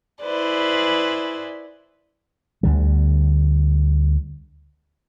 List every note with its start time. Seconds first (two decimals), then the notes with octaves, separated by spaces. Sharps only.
0.21 E4 G#4 B4 C5 D5
2.63 D2 D3 G3